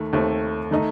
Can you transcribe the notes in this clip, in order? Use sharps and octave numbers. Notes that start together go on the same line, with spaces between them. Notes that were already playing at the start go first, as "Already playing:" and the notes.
Already playing: D#2 D#3 A3
D#2 D#3 A3 C4
D#3 A3 D#4